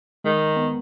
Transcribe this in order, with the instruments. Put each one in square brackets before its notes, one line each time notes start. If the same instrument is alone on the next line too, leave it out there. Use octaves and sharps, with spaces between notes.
[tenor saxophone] D#3 [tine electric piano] G#3
[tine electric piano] B3